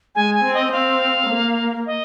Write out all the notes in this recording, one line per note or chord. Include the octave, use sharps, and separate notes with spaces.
G#3 G#5
G#5
C4
D#5
C4 F5
A#3
D#5